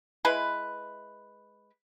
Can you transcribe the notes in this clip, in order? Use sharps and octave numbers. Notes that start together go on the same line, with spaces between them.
G#3 E4 B4